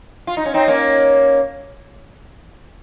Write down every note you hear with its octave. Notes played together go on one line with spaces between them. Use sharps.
F4
D#4
C#4
C4 D#4
A#3 C#4